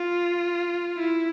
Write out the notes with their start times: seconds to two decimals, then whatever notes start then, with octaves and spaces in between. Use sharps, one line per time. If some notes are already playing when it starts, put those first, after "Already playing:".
Already playing: F4
0.98 E4